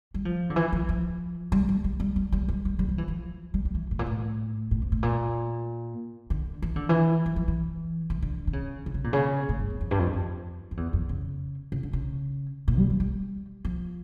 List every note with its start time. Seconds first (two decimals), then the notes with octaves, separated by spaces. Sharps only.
0.14 G3
0.25 F3
0.50 D3
0.56 E3
0.73 F3
0.89 F3
1.52 G3
1.69 G3
1.84 G3
2.00 G3
2.16 G3
2.32 G3
2.48 G3
2.65 G3
2.79 G3
2.89 F3
2.98 E3
3.08 F3
3.54 G3
3.65 G3
3.75 E3
3.91 A2
3.99 A#2
4.06 A2
4.71 A2
4.82 F2
4.92 A2
5.03 A#2
6.30 D3
6.62 E3
6.76 D3
6.89 E3
7.26 F3
7.36 F3
7.48 E3
8.10 E3
8.22 D3
8.47 D3
8.53 C#3
8.86 D3
8.94 C#3
9.04 A#2
9.13 C#3
9.49 A2
9.59 G2
9.70 E2
9.81 F2
9.91 G2
9.99 F2
10.13 F2
10.71 F2
10.77 E2
10.93 F2
11.09 C#3
11.72 C#3
11.83 D3
11.93 C#3
12.68 A#2
12.78 G3
12.90 F3
13.00 G3
13.65 F3